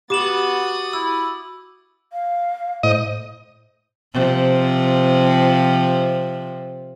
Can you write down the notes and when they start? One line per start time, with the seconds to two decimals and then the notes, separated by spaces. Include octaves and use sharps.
0.10 B3 F#4 G4 D6 D#6 A6 E7 F#7
0.93 E4 E6
2.13 F5
2.83 A2 C5 D#5
4.13 C3 F3